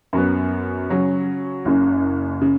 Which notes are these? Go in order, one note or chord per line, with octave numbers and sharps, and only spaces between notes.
F#2 F#3 B3
C#3 F#3 C#4
F#1 F#2 C#3
C#3